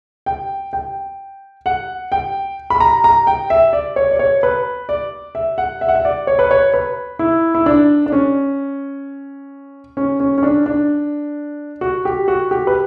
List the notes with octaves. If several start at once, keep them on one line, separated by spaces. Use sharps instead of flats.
G5
G5
F#5
G5
B5
A#5
A#5
G5
E5
D5
C#5
D5
C#5
B4
D5
E5
F#5
E5
F#5
E5
D5
C#5
B4
C#5
B4
E4
E4
D4
D4
C#4
C#4
C#4
C#4
D4
D4
F#4
G4
F#4
G4
B4